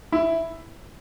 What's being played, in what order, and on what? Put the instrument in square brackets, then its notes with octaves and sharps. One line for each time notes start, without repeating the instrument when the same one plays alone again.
[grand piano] E4